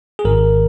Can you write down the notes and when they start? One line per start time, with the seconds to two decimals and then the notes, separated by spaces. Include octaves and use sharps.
0.19 G#4
0.25 G#1 G#2 D#3 A#4